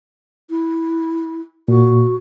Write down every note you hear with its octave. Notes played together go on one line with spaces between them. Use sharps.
E4
A#2 F#4